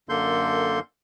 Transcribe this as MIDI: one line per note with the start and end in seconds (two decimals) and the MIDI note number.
0.09 0.80 42
0.09 0.80 50
0.09 0.80 58
0.09 0.80 69
0.09 0.80 84
0.09 0.80 91